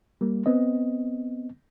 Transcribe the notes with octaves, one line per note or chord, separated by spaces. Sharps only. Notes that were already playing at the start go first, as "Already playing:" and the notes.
G3 A#3
B3 C4 D#5